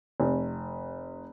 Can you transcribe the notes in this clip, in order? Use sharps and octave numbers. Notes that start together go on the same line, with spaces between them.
F1